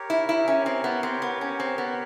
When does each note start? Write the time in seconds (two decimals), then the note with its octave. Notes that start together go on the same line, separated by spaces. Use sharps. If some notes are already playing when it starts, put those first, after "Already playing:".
Already playing: G4 A#4 C#5
0.10 E4
0.29 E4
0.48 C#4
0.66 C4
0.84 B3
1.03 C4
1.22 B3
1.41 C#4
1.60 C4
1.78 B3